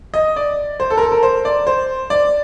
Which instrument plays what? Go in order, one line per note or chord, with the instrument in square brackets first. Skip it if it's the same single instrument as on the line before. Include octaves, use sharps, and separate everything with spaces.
[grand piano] D#5
D5
C5
A4
A#4
A4
A#4
C5
D5
C5
D5